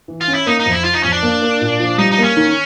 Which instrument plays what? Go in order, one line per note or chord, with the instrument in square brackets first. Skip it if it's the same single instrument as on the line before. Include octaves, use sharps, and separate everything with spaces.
[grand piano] E3
[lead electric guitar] F4
[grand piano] C#4
[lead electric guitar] E4
[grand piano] A#3 [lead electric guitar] D#4
[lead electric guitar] D#4
[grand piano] F2
[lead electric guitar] E4
[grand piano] F3 [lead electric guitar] F4
[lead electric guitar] D#4
[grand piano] F2 [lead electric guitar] C#4
[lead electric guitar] D4
[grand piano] A#3
A#3
A#2
F3
[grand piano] G3 [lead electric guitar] D#4
[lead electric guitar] D#4
[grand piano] A#3
[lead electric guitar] C#4
[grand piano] D#3